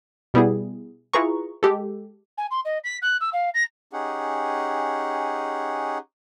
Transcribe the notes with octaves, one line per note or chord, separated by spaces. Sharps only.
B2 G3 B3 E4 G#4
E4 F4 G#4 B4 A#5 C#6
G#3 G4 A4
G#5
C6
D#5
B6
F#6
E6
F5
A#6
C#4 D#4 G4 G#4 F#5